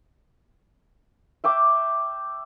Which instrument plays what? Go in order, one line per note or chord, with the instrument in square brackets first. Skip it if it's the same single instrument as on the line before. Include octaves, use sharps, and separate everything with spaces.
[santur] E5 G5 D6